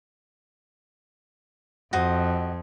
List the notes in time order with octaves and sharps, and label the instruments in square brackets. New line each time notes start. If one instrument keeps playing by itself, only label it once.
[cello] F2 [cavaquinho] F#4 C5 D#5